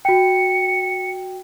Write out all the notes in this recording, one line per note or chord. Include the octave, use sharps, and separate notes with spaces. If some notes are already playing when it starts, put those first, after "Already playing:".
F#4 G5 C#7